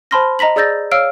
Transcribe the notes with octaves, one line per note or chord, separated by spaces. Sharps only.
C5 A5 B5 C6 F6 A#6
D#5 A#5 A#6 B6 F#7
G#4 D5 E6 G6 A6 A#6
C#5 F5 E6 F6 D7